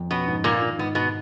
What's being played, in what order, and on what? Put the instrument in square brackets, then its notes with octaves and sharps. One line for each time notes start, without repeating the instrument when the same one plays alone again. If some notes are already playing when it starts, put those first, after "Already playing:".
Already playing: [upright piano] F2
[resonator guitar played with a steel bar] B2 B3 [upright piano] C#4
[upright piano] G#2
[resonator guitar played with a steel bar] A#2 A#3 [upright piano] F4
[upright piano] D#3
[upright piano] G#2 [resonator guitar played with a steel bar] B3
[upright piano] G#2 [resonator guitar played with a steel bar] B2 B3